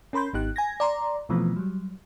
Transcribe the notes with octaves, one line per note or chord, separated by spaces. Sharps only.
C#4 A#4 B5 C6 G6
G#1 B3 D#4 G4 F#6
G#5 G#6 A#6
D5 A#5 C6
B2 E3 F3 A3 B3 C4
F#3 G3